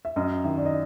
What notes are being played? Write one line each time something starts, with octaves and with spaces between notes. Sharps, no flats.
E5
F#2 D#5
D#3 E5
D5
D#5